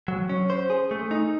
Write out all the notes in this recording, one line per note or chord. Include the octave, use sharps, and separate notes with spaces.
F#3
C#4
C5
G#4
A3
D#4